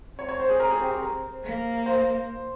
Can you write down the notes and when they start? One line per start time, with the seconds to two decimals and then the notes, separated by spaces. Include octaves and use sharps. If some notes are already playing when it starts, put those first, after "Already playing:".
0.19 C4 C#5
0.29 C#5
0.40 C5
0.49 G#4
0.60 A#4
0.70 G#4
0.81 G4
0.91 G4
1.02 A#4
1.44 A#3
1.86 C5